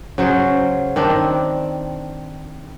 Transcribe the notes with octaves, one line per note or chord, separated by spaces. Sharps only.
C#3 F#3 C5
D#3 C4 D4